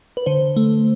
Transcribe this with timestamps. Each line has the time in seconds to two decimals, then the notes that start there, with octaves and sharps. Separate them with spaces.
0.17 B4
0.26 D3 C5
0.56 A3